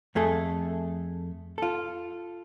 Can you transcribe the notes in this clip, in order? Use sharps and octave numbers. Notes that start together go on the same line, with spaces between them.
F2 A3 G#4 A4
F4 A4